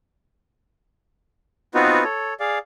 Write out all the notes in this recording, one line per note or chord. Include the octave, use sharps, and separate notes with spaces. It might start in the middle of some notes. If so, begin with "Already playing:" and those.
B3 C4 D#4 F4 F#4 B4
A4 C#5
G#4 D5 F5